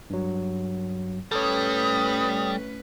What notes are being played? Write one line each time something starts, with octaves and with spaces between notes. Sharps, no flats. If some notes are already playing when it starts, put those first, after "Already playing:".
G2 F#3
A2 G3 C#4 A4 B4 C#5 D#6